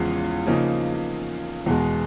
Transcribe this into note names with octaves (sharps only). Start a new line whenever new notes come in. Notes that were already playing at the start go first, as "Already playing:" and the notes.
Already playing: E2 C#3 F3 G#3
C#3 F3 A#3 D#4
E2 B2 G#3